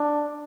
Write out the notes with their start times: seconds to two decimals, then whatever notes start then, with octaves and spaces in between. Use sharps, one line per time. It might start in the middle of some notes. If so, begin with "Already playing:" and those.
Already playing: D4